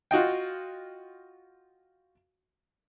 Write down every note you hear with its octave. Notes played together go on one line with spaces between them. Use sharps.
F4 F#4 D#5 G5